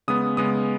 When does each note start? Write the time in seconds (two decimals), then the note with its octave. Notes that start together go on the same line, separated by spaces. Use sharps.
0.08 C#3 G#3 B3 D#6
0.37 C#3 G#3 B3 D#6